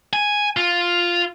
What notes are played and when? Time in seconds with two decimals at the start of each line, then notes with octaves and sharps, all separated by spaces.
0.13 G#5
0.57 F4